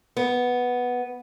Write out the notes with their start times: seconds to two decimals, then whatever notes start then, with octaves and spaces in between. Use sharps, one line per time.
0.17 B3